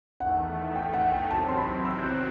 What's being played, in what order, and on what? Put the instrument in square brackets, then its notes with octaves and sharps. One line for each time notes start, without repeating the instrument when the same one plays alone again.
[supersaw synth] E2 D#3 A3 [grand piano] F#5
[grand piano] G5
F#5
G5
[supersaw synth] E2 C3 D#3 F#3 C4 [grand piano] A5
[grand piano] C6
B5
E6
G6
F#6